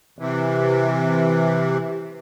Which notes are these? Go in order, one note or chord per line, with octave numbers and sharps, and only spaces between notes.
C3 E3